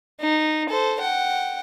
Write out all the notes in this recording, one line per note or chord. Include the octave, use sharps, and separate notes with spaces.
D#4
A4 C5
F#5 G5